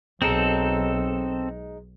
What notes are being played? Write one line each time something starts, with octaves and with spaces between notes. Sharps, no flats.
B1 F#3 G#3 C4 D#4 A4